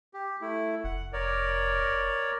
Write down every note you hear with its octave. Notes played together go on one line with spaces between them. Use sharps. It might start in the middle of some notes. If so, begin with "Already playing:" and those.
G4
A3 E4
F1 F#5
A#4 C#5 D5